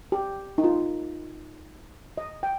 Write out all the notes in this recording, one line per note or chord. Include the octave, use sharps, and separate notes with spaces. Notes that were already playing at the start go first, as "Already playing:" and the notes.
G4
D#4
F4
D#5
G5